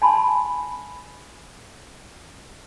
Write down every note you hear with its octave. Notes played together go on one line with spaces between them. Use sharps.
G#5 A5 B5 C6